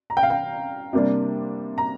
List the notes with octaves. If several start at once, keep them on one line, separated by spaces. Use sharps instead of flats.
A#5
G5
F5
G5
C3 G3 A#3 D4
A#5